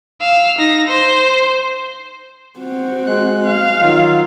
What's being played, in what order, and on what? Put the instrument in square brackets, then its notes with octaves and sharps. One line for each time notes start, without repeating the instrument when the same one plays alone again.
[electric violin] F5 E6
D#4 A#6
C5
[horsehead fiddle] C4 F#4
[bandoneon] G#3 F#6
[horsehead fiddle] F5
[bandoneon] D#3 F#3 F4